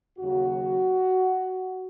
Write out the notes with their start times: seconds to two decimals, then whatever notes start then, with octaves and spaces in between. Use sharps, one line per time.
0.19 D#2 C#3 F#3 F#4